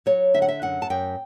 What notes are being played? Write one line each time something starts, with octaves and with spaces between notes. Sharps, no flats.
F#3 C#5
D3 E5
F#5
E5
F#2 F#5
A5
F#2 G5